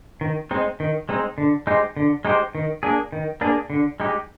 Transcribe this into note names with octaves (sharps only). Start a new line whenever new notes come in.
D#3
G#3 C4 D#4
D#3
G#3 C4 D#4
D3
G#3 D#4 G4 C5
D3
G#3 D#4 G4 C5
D#3
A#3 D4 G#4
D#3
A#3 D4 G#4
D3
G#3 D#4 G4